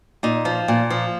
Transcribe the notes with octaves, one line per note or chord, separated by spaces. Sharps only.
A#2 D#4
F3
A#2
F3